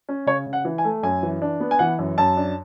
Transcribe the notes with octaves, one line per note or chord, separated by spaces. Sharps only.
C#4
C#3 C#5
C#3
F#5
E3
G#5
A3
F#2 G#5
E3
D4
B3
G#5
E3 F#5
F#2
F#2 A5
D4